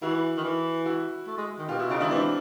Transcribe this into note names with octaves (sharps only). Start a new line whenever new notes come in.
E3 E4 F#4
D#3
E3
E4 F#4
A3
G#3
D#3
B2 F4 G4
B2 E4 F#4
C#3 D#4 F4
D#3 D4 E4
E3 C4 D4